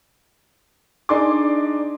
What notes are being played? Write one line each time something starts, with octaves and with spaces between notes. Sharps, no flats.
D4 D#4 G#4 D5 C6 D6